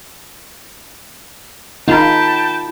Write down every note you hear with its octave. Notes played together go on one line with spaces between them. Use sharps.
D#4 F4 G5 A5 B5 G6